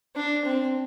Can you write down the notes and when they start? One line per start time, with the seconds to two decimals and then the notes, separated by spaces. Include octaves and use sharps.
0.16 D4
0.45 C4